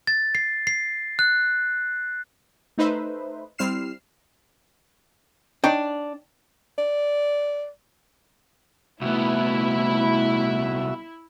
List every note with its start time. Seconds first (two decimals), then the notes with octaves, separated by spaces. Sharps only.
0.07 A6
0.35 C7
0.67 C7
1.19 F#6
2.78 A3 D#4 B4 C5 E5
3.58 G3 C4 E4 F6 C7 E7
5.64 D4 D#4 C#5 G5
6.78 D5
9.01 C2 A3 B3 E4 F#4 E5